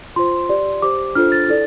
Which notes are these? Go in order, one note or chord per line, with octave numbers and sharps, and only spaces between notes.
F4 C5 C6
G4 D5
G4 C5 D6
D4 F4 A4 C5 F6
A6
E4 A4 D5